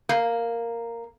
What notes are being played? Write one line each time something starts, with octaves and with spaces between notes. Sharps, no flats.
A#3